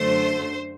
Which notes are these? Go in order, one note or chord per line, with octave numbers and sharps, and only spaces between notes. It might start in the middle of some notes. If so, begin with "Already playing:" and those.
Already playing: F#2 D3 A3 C5